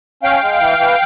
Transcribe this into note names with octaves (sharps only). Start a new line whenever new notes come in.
C#4 F5 G5
G#3
E3
E3